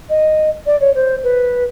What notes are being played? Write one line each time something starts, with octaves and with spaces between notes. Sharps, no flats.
D#5
D5
C#5
C5
B4